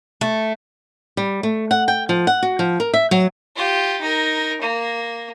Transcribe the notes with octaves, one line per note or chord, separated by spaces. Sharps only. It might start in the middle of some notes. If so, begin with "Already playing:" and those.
A3
G3
A3
F#5
G5
F3
F#5
F#4
F3
A#4
E5
F#3
F4 G4
D#4 A#4
A#3